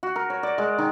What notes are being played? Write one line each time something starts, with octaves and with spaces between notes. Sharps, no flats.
F#4
A#4
C#5
D5
G#3
D#3